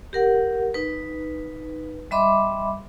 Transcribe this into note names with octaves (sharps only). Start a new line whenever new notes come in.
G4 A#4 F#5
D#4 B4
G3 D#5 E5 B5 C6 D6